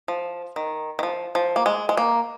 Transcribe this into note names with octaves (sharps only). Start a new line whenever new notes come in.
F3
D#3
D#3
F3
F3
A#3
G#3
G#3
A#3